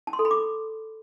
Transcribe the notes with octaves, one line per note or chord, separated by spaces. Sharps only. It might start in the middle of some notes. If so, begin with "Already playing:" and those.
A5
C6
A4
B5
D6